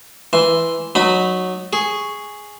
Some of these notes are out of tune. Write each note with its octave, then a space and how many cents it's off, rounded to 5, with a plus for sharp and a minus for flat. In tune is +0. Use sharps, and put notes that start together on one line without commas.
E3 +0 C6 +0
F#3 -10 D#4 -25 B5 +0
G#4 +0 C#6 +0